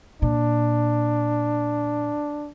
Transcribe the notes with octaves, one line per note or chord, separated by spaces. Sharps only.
A#2 D4